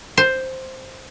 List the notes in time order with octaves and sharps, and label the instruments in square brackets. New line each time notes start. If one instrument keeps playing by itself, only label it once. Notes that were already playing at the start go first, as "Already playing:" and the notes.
[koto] C5